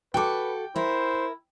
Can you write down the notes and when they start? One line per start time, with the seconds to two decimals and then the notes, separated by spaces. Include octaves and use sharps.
0.14 F#4 A4 B4 G5 D6
0.76 E4 A#4 C5 E5